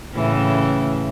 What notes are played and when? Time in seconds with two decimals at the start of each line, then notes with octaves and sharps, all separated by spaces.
0.14 A2 C#3 E3